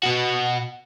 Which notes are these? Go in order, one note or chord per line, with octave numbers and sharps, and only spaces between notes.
B2 F#4